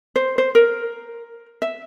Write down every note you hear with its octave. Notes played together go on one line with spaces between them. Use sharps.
C5
C5
A#4
E5